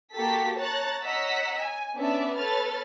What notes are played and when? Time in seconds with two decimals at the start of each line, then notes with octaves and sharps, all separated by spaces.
0.14 A#3 F#4 G4 A4 A6 B6
0.57 C#5 A5 A#5 F#6 A6
1.03 C#5 D#5 F#5 A#5 E6 B6
1.61 G#5
1.97 B3 C#4 D4 D5 E5 A5
2.37 A4 B4 C#5 F6 A6